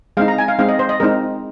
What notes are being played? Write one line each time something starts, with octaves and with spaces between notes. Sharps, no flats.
G#3 C4 D#4 F5
A#5
G#5
F5
G#3 C4 D#4 F5
D#5
C5
D#5
G#3 C4 D#4 A#4